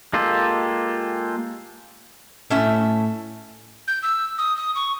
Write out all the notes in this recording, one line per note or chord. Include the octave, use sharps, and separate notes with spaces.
G#3 A#3 F4 G4 A4
A2 A3 C#4 E5
G6
E6
D#6
D#6
C#6